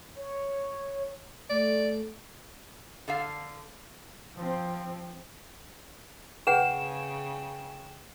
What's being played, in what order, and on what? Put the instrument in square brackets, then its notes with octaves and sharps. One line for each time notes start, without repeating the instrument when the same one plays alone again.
[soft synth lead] C#5
[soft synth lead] A3 [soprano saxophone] D5
[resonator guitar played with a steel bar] D3 A4 F5
[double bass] F3 C4
[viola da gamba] C#3 [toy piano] G#4 B4 F#5 [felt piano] G5 [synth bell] E7